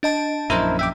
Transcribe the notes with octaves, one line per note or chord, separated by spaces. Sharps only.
D4 D#5 A5
A#1 F#2 E4 A#4 C5
E5 G5 D6